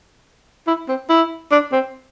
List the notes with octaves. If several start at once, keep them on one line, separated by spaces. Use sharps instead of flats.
E4
C4
E4
D4
C4